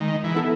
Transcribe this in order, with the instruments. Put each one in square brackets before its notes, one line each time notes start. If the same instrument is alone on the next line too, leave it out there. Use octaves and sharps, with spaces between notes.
[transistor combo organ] D#3 [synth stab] G#3
[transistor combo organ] E3
[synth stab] B3 E4 A4